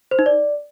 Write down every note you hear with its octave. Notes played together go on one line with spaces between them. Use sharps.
C5
D#4
D5